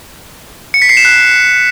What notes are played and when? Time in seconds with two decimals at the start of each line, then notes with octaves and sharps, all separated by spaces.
0.74 C#7
0.82 B6
0.89 C7
0.97 E7
1.05 F#6